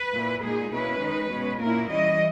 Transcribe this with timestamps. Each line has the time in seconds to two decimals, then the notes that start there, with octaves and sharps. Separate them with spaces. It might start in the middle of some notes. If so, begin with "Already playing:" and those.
Already playing: B4
0.13 A#2 A#3 E4
0.43 A#2 G#3 D#4 G#4
0.72 B2 A#3 C#4 E4 B4
1.01 D#3 G#3 D#4
1.31 B2 G#3 C#4
1.60 A#2 A#3 C#4 E4 A#4
1.90 E3 G3 C#4 E4 D#5